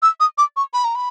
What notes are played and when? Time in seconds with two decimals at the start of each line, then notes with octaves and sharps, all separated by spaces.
0.02 E6
0.20 D#6
0.38 D6
0.56 C#6
0.74 B5
0.84 A#5
0.95 B5